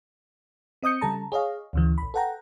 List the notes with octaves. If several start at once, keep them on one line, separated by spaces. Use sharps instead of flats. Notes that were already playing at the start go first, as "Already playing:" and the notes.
C4 D#5 D#6 G6 C#7
C#3 G3 A4 A5 A#5
G#4 C#5 D#5 F5
D2 C#3 E3
A#1 B5
A4 B4 F#5 G5 A#5